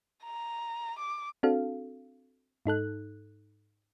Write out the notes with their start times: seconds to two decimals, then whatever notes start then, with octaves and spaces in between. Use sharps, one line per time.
0.24 A#5
0.99 D6
1.43 C4 D4 F#4 A4 F5
2.66 G#2 D#4 A4 F#6